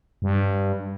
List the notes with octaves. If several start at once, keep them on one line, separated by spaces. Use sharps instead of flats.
G2